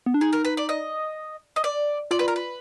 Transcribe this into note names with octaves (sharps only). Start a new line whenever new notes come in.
B3
D4
D#4 G#4
A#4
B4
D5
D#5
D#5
D5
F4 D5
B4
A#4
B4